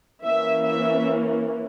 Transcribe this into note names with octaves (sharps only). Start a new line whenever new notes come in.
E3 A#3 C#4 E5
E5